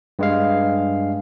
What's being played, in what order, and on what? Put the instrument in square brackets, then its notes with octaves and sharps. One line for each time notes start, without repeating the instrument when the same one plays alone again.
[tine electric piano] G2 G#3 F5